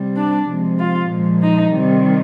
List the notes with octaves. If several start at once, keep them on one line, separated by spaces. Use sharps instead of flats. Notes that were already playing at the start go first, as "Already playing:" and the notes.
Already playing: C3 G3
D4
C3 F3 G#3
F4
A#2 F3 G#3
D#4
C3 D#3 G3